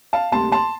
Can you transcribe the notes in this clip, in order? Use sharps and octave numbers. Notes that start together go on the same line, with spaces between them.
F5 A5
D2 C3 G3 A#3 A5 C6
A5 C6